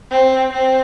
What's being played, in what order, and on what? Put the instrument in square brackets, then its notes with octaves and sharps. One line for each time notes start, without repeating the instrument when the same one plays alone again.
[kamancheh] C4
C4